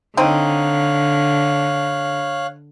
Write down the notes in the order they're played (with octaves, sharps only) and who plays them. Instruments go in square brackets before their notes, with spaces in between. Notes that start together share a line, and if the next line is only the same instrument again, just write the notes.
[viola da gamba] D3 [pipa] C4 D#4 [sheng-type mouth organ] C#5 F5 F#6